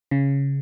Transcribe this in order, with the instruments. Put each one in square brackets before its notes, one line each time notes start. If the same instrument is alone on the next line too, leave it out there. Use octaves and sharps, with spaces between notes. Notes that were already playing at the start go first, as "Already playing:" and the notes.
[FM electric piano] C#3